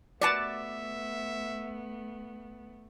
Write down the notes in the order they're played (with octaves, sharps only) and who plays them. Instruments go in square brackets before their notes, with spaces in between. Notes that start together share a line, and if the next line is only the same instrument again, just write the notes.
[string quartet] A3 B3 [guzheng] F#4 B4 F#5 [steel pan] D5 A5 [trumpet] E5